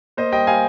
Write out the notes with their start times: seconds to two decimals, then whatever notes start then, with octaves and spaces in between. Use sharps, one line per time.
0.17 A#3 C5 D#5
0.32 G3 D#5 G5
0.47 G3 F5 G#5